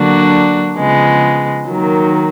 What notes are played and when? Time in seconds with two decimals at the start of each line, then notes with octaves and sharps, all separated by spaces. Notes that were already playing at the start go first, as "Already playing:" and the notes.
Already playing: D3 F#3 A#3 D4 F#4
0.77 C#3 F3 G#3 B3
1.66 D#3 F#3 A#3